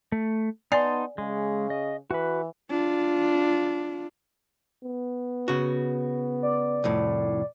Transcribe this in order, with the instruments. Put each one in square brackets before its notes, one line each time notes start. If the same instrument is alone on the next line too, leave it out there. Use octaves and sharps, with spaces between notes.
[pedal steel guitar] A3
[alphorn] B3 [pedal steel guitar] D#4 A5 C6 [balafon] D5 G#5
[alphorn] C#3 [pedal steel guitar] G#3
[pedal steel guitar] D#5
[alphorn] E3 [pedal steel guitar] F#4 B4
[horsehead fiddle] D4 F4
[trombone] B3
[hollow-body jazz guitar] C#3 F#4
[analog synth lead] D5
[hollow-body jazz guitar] C2 F2 A2